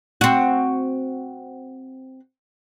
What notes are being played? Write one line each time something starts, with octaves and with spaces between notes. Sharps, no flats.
C4 F#4